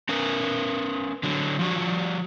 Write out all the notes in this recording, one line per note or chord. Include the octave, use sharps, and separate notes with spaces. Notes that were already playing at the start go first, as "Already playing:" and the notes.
C#4 A#4 B4
D3 F#3
F3 G3 F#4